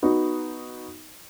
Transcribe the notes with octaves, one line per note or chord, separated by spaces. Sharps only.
B3 D#4 F#4